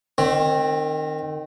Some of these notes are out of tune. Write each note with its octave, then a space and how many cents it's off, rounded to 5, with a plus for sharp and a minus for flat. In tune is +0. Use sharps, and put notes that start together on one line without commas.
D#3 -20 C4 +15